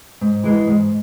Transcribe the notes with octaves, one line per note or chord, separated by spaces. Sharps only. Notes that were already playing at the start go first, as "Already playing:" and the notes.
G#2
E3 G#3
G#2